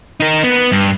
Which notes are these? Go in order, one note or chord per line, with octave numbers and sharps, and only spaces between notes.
D#4 A#4
B3
G2